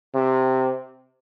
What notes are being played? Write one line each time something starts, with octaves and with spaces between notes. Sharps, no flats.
C3